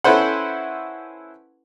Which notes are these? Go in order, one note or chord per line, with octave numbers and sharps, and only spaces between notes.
C#4 E4 A4 B4 C5 F#5